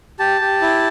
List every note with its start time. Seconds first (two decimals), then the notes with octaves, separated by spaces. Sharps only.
0.19 G4 A5
0.41 G4
0.61 E4